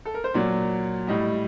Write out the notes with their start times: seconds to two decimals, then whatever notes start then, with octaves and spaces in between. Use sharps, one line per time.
0.05 A4
0.14 A#4
0.24 C5
0.34 A#2 F#3 D5
1.07 A2 G3 D#5